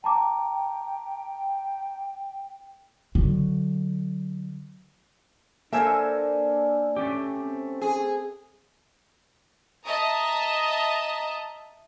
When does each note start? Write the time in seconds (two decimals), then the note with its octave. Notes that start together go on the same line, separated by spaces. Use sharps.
0.04 G5 A5 A#5 D6
3.15 D3 F#3
5.73 A#3 D4 A4 A#4 C5 E5 G#5
6.96 A3 C#4 G4
7.39 C4
7.81 G#4
9.85 D#5 E5 A5 A#5 D#6